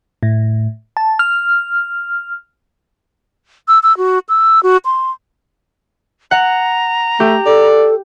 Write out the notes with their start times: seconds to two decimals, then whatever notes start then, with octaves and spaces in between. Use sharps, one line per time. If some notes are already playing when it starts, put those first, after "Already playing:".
0.23 A2
0.97 A5
1.19 F6
3.68 E6
3.83 E6
3.97 F#4
4.29 E6
4.63 F#4
4.85 C6
6.31 F#5 A#5
7.20 A3 G4
7.46 A4 D5